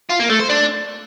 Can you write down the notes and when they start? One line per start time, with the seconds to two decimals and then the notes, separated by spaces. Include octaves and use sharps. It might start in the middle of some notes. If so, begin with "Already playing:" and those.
0.09 F4
0.20 A#3
0.30 A3
0.40 C5
0.50 D4